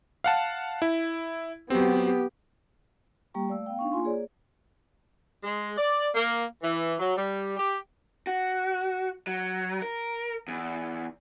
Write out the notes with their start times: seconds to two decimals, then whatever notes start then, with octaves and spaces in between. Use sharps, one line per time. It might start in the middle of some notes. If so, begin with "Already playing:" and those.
0.24 F5 F#5 A5
0.82 E4
1.70 F#3 B3 C4 G4
3.34 G3 A#3 G4 G5 A#5 C#6
3.49 A3 D5 F5 E6
3.66 B3 F5 G5
3.79 D4 D#4 F5 C#6
3.92 A#3 F4 G#5 C6
4.04 A#3 G#4 C#5 D5
5.44 G#3
5.78 D5
6.15 A#3
6.63 E3
6.99 F#3
7.17 G3
7.57 G4
8.27 F#4
9.27 F#3
9.82 A#4
10.48 E2